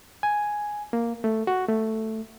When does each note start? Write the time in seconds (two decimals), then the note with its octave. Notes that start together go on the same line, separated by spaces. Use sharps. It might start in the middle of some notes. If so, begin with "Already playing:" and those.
0.23 G#5
0.93 A#3
1.24 A3
1.47 F#4
1.68 A3